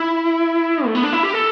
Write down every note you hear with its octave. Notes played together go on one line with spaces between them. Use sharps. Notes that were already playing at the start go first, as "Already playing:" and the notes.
Already playing: E4
A3
B3
D4
E4
G4
A4